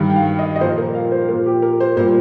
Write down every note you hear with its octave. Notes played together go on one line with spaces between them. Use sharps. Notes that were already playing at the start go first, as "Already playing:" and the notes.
Already playing: G2 D#3 G3
G5
F5
D#5
D#5
A#2 F3 C5
A#4
F5
C5
A#2 F3 A#4
G4
A#4
C5
A#2 G3 C5